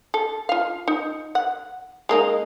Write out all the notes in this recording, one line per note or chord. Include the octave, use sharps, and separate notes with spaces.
A4
F4 F5
D#4
F#5
G#3 A#3 D#4